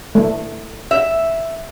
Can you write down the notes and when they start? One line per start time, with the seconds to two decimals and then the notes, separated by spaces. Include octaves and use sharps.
0.15 A3
0.91 E5